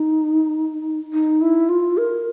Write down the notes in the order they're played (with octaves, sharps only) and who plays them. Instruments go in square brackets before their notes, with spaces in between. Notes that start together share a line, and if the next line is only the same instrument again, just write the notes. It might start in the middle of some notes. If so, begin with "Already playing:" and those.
Already playing: [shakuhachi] D#4
D#4
E4
F4
A#4